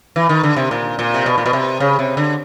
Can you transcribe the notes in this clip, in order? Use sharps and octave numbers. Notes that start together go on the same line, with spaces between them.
E3
D#3
D3
C3
A#2
A#2
C3
B2
A#2
B2
C3
C#3
C3
D3